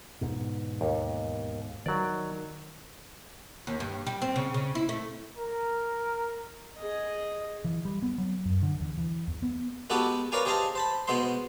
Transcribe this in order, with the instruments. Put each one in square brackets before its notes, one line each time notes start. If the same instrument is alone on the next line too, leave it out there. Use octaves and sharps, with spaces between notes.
[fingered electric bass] E2 G#2 B2
[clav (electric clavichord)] D#2
[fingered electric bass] D#3 [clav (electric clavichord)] F#3 D5
[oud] D#2
G2
G3
C4
C#3
C#3
E4
A3
[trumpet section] A#4
[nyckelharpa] G#4 D#5
[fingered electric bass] E3
G3
B3
F#3
F#2
D3
E2
E3
E2
B3
[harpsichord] G#3 B3 F#4 G4 A4 B4
A#4 B4 C#5 D5 F5 G#5
G4 G#4 C5 D#5 F5 A5
C5 A5 B5
B2 G#3 B3 C5 C6